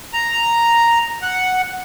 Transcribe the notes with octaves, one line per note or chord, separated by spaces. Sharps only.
A#5
F#5